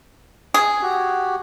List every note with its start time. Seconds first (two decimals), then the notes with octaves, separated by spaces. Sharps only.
0.54 G#4
0.82 F#4 G4